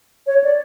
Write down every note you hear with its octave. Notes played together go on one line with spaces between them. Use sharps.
C#5
D5